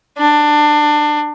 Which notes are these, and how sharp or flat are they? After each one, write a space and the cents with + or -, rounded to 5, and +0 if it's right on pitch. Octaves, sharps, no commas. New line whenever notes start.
D4 +20